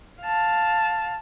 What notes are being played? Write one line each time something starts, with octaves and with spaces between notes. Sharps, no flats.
F5 A5